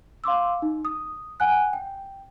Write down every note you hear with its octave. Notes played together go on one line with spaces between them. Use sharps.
F5 C6 D6 E6
D#4
D#6
F#5 G#5 F#6
G5